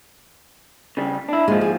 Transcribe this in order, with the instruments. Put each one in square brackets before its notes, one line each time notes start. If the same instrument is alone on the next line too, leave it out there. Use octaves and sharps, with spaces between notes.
[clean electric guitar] C#3 G3
D4 E4
[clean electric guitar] D#2 F3 [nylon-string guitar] G#3
[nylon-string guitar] G#4